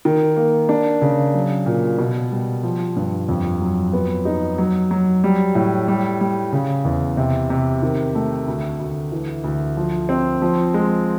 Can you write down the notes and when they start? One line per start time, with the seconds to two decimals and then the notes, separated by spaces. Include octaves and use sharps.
0.05 D#3
0.36 A#3
0.69 D4
1.01 C#3
1.35 F#3
1.66 A#2
1.98 B2
2.32 G3
2.63 F3
2.96 G2
3.29 F2
3.61 F#3
3.93 B3
4.25 D#4
4.58 F#3
4.91 F#3
5.24 G3
5.55 A2
5.88 G3
6.21 G3
6.52 C#3
6.85 E2
7.17 C3
7.50 C3
7.83 D#3
8.15 A3
8.48 D2
8.80 D2
9.12 E3
9.44 D2
9.77 F3
10.09 C4
10.42 F3
10.74 G#3